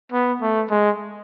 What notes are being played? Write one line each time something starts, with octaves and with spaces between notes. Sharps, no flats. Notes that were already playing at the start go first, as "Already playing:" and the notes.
B3
A3
G#3